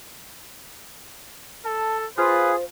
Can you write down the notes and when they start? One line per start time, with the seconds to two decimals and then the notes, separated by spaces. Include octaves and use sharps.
1.65 A4 A5
2.18 F4 G#4 B4 C5